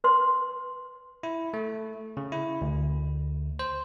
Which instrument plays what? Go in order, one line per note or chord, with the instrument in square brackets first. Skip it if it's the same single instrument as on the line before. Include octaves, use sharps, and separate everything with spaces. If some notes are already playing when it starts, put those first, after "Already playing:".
[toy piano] B4 C6
[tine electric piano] E4
A3
C#3
E4
D2
C5